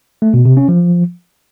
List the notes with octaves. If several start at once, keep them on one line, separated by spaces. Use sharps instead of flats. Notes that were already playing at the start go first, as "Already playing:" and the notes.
A3
B2
C3
C#4
F3